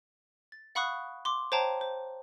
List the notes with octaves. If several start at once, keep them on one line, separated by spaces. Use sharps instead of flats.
A6
F5 F#5 B5 C#6 D#6 F#6
C6 D6
C5 C#5 F5 G5 A5 A#5
C5